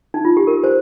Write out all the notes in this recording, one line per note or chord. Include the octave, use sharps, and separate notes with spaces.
D#4
F4
G4
A#4
C5